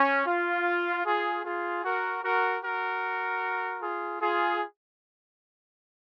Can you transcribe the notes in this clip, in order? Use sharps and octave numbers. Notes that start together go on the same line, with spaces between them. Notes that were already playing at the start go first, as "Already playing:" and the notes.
Already playing: C#4
F4
F4 G#4
F4 G#4
F#4 A#4
F#4 A#4
F#4 A#4
F4 G#4
F4 G#4